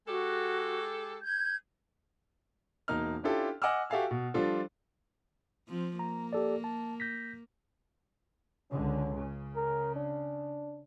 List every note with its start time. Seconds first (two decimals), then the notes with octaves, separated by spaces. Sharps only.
0.08 G#3 F#4 G4 A4
1.23 G6 G#6
2.88 E1 A#3 D#4 F6
3.23 C#4 D4 E4 F4 G4 A4
3.62 D#5 F#5 G#5 D6 E6 F6
3.90 F#4 G4 A4 E5 F5 G#5
4.11 B2
4.34 F3 G3 D4 F4 A4
5.69 F3 C4
5.99 A#3 A#5
6.33 G4 A4 D5
6.64 A5
7.00 G6 A#6 B6
8.71 C#2 D3 C#4
9.16 C#3
9.56 A#4
9.96 D4